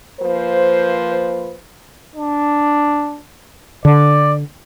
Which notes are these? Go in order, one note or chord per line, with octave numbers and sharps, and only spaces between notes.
F3 A#3 B4 C5
D4
D3 D5